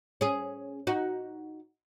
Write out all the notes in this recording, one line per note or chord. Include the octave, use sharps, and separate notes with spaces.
C#4 G#4
D#4 F#4